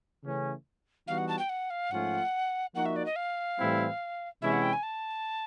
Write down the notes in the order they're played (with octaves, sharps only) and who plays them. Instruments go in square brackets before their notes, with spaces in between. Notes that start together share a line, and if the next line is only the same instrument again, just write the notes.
[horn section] C#3 E3 A3 C#4
[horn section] E3 G3 B3 D#4 F#4 [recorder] F5
[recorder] F#5
A5
G5
F#5
F5
[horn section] G#2 F3 A3 C#4 F4 [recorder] F#5
[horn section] F3 A#3 D#4 F#4 [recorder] F#5
[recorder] E5
D5
D#5
F5
[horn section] A2 E3 G3 C4 E4
[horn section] C3 E3 G#3 C#4 E4 [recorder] E5
[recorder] F#5
G5
G#5
A5